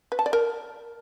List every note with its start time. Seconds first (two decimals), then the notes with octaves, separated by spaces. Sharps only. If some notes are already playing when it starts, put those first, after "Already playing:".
0.12 B4
0.19 A5
0.26 D5
0.33 A#4